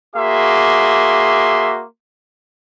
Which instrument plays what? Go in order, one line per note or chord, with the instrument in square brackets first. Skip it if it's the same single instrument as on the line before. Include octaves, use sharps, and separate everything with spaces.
[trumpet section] A#3 F#4 G#4 E5 C6 D6